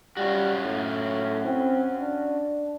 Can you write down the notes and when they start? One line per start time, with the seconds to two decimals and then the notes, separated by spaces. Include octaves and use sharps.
0.17 G3 C#4 F4 F#4
0.64 A2
1.45 C4
2.00 D4